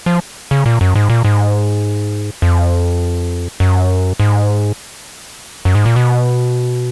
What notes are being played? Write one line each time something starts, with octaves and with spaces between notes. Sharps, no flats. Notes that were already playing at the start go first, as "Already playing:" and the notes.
F3
C#3
A#2
F#2
G#2
A#2
G#2
F2
F#2
G#2
F#2
G#2
A#2
B2